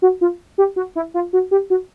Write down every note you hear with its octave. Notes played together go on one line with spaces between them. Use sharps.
F#4
F4
G4
F#4
E4
F4
F#4
G4
F#4